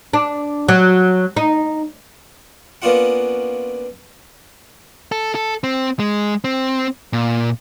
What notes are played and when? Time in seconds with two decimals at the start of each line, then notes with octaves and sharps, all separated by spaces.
0.13 D4
0.68 F#3
1.37 D#4
2.82 A#3 B3 C#4 D4 F4 F#5
5.12 A4
5.35 A4
5.64 C4
6.00 G#3
6.44 C4
7.13 A#2